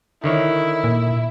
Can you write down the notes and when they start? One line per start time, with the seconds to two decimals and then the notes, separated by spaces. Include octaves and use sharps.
0.24 D3 D#3 E4 C#5
0.84 A#2